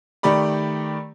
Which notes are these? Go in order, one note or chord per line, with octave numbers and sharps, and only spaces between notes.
D#3 A3 G4 D5 B5